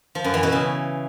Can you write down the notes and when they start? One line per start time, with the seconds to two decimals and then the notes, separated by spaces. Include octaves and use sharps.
0.15 F3
0.24 F#2
0.34 E3
0.43 B2
0.52 C#3